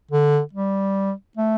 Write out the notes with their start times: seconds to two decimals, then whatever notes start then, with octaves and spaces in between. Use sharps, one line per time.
0.11 D3
0.53 G3
1.37 A3